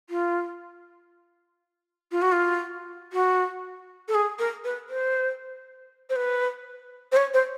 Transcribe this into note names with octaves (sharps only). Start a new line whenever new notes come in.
F4
F4
F#4
F4
F#4
A4
G#4
A#4
B4
C5
C5
B4
C5
C#5
C5